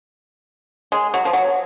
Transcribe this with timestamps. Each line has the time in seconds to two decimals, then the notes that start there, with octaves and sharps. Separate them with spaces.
0.92 G#3
1.14 F#3
1.25 F3
1.33 F#3